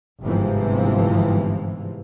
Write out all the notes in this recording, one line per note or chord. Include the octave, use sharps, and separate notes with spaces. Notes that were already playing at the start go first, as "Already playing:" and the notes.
G1 G#2 C3 E3 F3